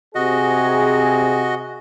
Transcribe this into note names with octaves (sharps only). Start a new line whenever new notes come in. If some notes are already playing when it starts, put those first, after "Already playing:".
C3 F#4 G#4 D#5